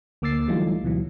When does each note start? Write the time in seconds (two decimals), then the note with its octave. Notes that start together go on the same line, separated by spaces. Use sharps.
0.22 D2 A#3 D6 E6 A6 C7
0.48 E3 F#3 G3 A3 D#4 F4
0.83 D2 B2 E3 F#3